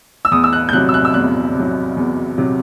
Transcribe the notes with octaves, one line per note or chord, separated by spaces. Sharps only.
E6
E2 D#6
E6
F#6
G6
C3 F#3 F#6
E6
F#6
E6
E2 F#6
C3 F#3
E2
C3 F#3